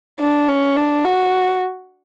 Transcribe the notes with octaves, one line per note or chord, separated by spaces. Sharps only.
D4
C#4
D4
F#4